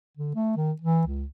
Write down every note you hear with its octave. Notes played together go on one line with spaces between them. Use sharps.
D3
A3
D#3
E3
C#2